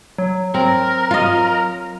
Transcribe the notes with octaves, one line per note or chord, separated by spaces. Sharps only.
F#3
C4 A#4
F4 D#5